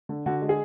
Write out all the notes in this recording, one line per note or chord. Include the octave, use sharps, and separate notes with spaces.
D3
D3 F#4
G#3
G#4